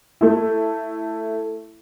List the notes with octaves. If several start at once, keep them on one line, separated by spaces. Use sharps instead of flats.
A3 E4